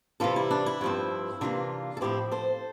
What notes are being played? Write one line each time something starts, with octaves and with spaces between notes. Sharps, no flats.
C3 E3 G3 F4 A4
E4
D4
E4
G2 F3 C4
C3 E3 A#3 D4 F4
A4
A2 F3 C4 E4 G4
A4 C5